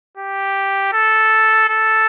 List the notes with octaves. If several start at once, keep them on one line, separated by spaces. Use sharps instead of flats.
G4
A4
A4